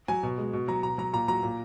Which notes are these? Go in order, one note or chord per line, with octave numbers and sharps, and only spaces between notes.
F#3 G#5
B2
G#3
B2
F#3 A#5
B2 A#5
F#3 A#5
A#2 A#5
F#3 A#5
A#2